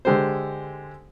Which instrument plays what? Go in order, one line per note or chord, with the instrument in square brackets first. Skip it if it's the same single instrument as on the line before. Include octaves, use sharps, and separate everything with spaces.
[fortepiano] D3 G#3 G4 A4 C5